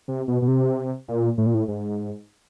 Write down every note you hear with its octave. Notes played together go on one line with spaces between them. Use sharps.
C3
B2
B2
C3
A#2
A2
A#2
A2
G#2